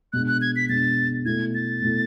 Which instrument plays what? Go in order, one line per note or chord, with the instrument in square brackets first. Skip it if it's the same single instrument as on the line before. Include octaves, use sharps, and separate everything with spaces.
[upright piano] B2 G#3 D4 [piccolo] F#6
[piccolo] F#6
G#6
B6
[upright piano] B2 G#3 D4 [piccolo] A6
[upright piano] B2 A3 E4 [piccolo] G#6
[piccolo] A6
[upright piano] B2 A3 E4